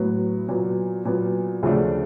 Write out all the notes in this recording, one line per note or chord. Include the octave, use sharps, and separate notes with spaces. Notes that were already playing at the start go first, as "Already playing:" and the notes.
Already playing: A2 F#3 B3
A#2 F#3 B3
A#2 F#3 B3
D2 C#3 F3 A3 D4